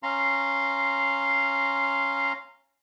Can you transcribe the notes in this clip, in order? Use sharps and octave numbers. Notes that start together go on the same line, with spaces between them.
C#4 F5 A#5 C6